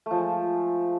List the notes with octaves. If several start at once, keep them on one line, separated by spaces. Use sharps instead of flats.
F3 G#3 A3